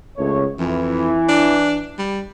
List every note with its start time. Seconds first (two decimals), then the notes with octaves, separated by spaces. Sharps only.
0.17 C#2 A3 C#5
0.59 F2 E3
1.29 D4
1.98 G3